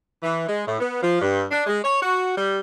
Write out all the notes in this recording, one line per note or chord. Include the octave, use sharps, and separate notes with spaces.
E3
G#3
A2
B3
F3
G2
D4
G#3
C#5
F#4
G3